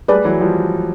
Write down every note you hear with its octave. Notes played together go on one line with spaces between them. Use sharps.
G3 A3 G#4 B4 D5
E3 F#3
F3 G3